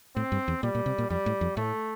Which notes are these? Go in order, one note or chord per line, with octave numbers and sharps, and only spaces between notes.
A2 C4
G2
E2
A#2 G3
A#2
C3
A#2
F2 G3
A2
F2
A2 A3